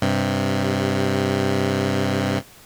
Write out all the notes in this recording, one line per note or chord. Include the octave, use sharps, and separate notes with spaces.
G2 C3